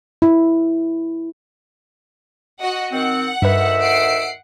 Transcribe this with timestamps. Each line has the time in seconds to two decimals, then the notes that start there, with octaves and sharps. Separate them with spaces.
0.22 E4
2.60 F#4 D#5 F#5
2.93 D#3 C4 F#5
3.42 D2 G2 D#3 B4 E5
3.79 F#5 C7 D7